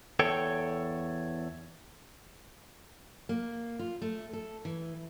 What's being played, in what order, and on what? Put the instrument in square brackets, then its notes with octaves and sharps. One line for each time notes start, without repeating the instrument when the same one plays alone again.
[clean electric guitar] E2 A4 C#5 G5
[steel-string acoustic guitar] A#3
F4
A3
A4
E3